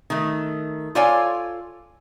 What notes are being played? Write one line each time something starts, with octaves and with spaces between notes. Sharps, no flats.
D#3 A3
F4 A4 C#5 D5 F5 G#5